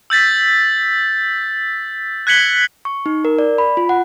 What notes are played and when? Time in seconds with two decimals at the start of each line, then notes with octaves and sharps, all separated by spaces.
0.10 E6 G6 A6 B6
2.27 F#6 G#6 B6 C#7 F#7 G7
2.85 C#6
3.06 D#4
3.25 A#4
3.39 D5
3.58 B5
3.77 F4
3.89 F#5